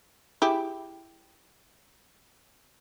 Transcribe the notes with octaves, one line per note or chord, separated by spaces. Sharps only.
E4 G4 G#4